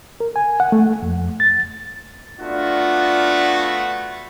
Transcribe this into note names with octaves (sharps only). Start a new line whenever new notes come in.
A#4
G#5
F#5
A3
F2
A6
A3 B3 D4 F4 F#4